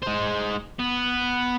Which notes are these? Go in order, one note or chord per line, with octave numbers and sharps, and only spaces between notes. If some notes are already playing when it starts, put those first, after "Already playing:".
G#3 C5
B3